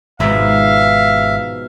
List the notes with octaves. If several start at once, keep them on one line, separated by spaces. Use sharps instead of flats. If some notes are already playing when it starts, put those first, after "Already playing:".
G#1 G#2 B2 F3 E5 F5